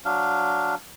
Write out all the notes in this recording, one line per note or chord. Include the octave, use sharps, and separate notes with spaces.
F#3 D4 F5